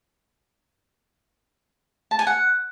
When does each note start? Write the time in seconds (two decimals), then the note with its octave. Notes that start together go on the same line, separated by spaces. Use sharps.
2.11 A5
2.19 G#5
2.27 F#5